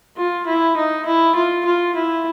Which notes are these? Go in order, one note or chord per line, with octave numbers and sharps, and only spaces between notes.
F4
E4
D#4
E4
F4
F4
E4